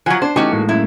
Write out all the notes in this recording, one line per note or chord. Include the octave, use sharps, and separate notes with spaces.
F3 F#3 F#5 G#5
D4 C5
E3 A3 C#4 D#4 F#4 G4
A2 G#3 A#3
F#2 E4